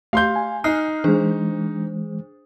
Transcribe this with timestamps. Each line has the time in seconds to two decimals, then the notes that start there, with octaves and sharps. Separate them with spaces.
0.13 A3 G4 F5 C6 G6
0.36 G#5
0.64 D#4 F6 F#6 C7
1.04 E3 G#3 D4 G#4 C5